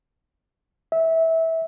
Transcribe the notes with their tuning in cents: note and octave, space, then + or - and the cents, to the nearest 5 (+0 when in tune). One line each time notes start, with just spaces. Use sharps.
E5 -20